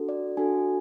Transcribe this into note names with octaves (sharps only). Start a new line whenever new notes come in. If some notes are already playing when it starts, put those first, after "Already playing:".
Already playing: D4 F#4 A4
D5
D4 F#4 A4 G#5